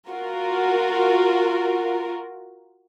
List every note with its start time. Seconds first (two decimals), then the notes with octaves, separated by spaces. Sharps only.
0.10 F4 F#4 A#4